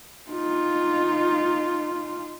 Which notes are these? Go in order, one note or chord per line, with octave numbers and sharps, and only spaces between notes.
D#4 F4